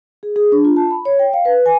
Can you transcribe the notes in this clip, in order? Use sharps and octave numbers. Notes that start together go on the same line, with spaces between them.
G#4
G#4
D4
F4
A5
B5
C#5
G5
F5
B4
G#5